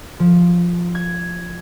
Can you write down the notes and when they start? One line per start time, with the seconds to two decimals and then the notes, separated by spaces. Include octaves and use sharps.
0.20 F3
0.95 G#6